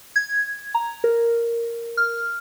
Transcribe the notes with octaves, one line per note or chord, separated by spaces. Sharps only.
G#6
A#5
A#4
F6